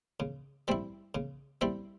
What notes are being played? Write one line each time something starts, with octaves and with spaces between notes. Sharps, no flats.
C#3
G3 C4 E4
C#3
G3 C4 E4